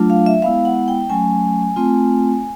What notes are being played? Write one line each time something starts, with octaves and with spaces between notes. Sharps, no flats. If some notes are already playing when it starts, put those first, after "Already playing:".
Already playing: F#3 A3 D4 F4
F5
E5
G#3 B3 E4 F5
F#5
G5
F#3 A3 C#4 G#5
A3 C4 F4